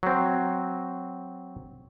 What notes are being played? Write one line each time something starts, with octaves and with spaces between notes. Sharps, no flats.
F#3 C4